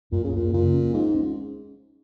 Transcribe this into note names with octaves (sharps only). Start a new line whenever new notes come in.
F#2 A#2
C#3
F#2 A#2
A#2 C#3
C#4
G#2 G#3
C#4